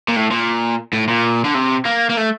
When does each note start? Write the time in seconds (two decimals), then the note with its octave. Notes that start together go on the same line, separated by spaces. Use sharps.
0.08 A#2
0.16 A2
0.31 A#2
0.93 A2
1.08 A#2
1.45 D3
1.55 C3
1.85 A#3
2.10 A#3
2.17 A3